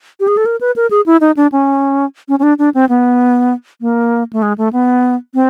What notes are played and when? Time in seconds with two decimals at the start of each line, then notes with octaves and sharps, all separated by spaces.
0.20 G4
0.28 G#4
0.37 A4
0.46 A#4
0.61 B4
0.76 A#4
0.91 G#4
1.06 E4
1.21 D#4
1.37 D4
1.52 C#4
2.28 C#4
2.39 C#4
2.43 D4
2.59 D4
2.74 C4
2.89 B3
3.81 A#3
4.33 A3
4.42 G#3
4.58 A3
4.73 B3
5.34 C4